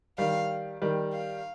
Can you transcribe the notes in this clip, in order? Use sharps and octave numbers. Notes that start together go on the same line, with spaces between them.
D#3 G3 F5
D#3 G3
F5